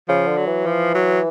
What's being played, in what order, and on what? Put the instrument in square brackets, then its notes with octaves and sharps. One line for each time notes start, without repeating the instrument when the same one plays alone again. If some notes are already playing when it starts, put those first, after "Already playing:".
[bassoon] C#3 [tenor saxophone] F3
[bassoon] D3
[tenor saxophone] F#3
[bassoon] E3
[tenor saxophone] F3
F#3